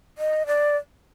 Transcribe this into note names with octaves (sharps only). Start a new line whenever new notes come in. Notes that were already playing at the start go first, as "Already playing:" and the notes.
D#5
D5